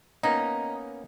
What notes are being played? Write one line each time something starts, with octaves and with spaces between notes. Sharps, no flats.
A#3 B3 C#4 D#4